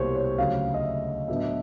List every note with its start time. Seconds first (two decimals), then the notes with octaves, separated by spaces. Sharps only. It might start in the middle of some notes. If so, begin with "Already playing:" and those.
Already playing: C2 B2 G3 A#3 C5 C#5
0.16 C#5
0.38 D2 C#3 F#3 F5
0.74 D#5
0.83 E5
1.28 A2 F#3 B3 D4 E5
1.36 D#5
1.42 E5